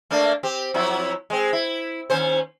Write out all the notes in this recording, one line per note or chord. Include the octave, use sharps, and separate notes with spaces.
A3 A#3 D4
C4 G4
F2 F#3 E4
G#3 C4
E4
D#2 C#4 C5